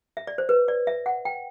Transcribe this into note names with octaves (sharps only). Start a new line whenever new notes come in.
E5
D5
C5
B4
D5
E5
F#5
G5